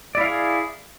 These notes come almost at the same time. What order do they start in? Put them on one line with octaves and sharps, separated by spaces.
D5 E4 F5 G#4